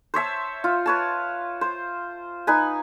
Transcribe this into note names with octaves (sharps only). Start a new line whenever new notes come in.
C5 C#5 E5 A5
F4
B4 C#5 A5
C5
D#4 B4 G#5